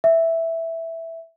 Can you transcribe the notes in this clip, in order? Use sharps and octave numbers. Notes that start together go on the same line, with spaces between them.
E5